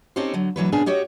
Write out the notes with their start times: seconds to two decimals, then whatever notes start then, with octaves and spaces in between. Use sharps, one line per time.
0.16 C4 C#4 D#4 G4 A4 C5
0.34 D3 F#3
0.56 D2 E3 F#3 B4
0.72 A#2 C#3 B3 D4 G#4
0.86 F#4 G4 C#5 D#5